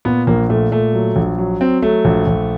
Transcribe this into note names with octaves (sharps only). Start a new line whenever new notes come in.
A#2 B3
A#1 A#3
A#2 A3
A#2 A3
F#3
A#1
F#3
F#3 C4
F#3 A3
A#1
A#1